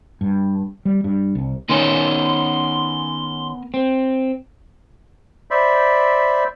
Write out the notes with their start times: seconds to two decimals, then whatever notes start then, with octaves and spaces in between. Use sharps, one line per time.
0.21 G2
0.85 G3
1.04 G2
1.35 C2
1.69 D#3 B3 C#4 A#4 G#5 C6
3.74 C4
5.51 C5 D5 E5 B5